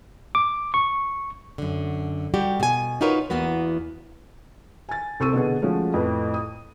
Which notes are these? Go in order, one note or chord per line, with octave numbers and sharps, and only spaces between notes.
D6
C#6
F#2 D3
G3 F#4 G4
B2 G#5
D#4 F4 F#4 A#4 B4 C#5
E2 A#3 B3 F#4 B4
G#5 A6
C2 C4 A4 C#6 E6 D#7
B2 D3 B3 G#4
F3 G#3 A3 C#4 F#4
F2 A2 B4
D#6